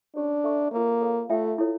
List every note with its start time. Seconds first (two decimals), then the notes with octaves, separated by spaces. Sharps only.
0.16 C#4 D4 G4 C#5
0.44 A4 E5 A#5 C#6
0.72 A#3 F4 A#4 C#5
1.01 A4 C#5 F5
1.29 A3 F4 A4 C#5 E5 G5
1.58 E4 A4 C#5